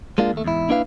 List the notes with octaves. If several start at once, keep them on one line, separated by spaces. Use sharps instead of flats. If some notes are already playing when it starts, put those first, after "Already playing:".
G#3 A#3 D4 F4
D#2 A3
E2 G#2 E4
A#3 D4 E4 B4 F5